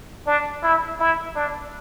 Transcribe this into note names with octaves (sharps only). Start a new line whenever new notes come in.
D4
E4
E4
D4